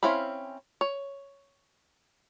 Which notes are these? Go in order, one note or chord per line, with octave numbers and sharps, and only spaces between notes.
C4 C#4 E4 F5 B5
C#5